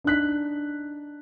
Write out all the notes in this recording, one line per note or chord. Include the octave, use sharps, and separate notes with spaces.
D4 D#4 F#6 B6